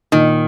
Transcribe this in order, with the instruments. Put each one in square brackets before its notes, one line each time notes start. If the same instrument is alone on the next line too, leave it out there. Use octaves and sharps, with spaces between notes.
[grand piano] A#2 [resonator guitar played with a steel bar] D#3